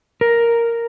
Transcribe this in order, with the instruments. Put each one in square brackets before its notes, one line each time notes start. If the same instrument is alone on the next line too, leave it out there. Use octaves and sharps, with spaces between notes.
[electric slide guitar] A#4